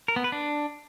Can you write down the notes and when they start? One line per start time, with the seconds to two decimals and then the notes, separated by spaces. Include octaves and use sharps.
0.08 A#4
0.16 B3
0.24 B4
0.32 D4